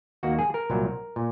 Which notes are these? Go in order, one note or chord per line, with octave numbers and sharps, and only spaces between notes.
D#2 D#3 A#3 F#4
G#4
A#4
C2 A#2 F#3 C4
A#2